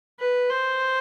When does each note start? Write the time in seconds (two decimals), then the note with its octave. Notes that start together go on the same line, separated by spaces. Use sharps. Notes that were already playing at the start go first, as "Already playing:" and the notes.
0.20 B4
0.50 C5